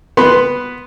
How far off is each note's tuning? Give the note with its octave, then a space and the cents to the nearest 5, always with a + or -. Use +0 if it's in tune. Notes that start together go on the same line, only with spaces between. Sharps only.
B3 +0 B4 +0 C6 +0